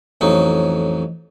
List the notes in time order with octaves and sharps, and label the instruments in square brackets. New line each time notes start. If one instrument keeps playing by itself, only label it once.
[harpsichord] A1 F2 F#3 D#4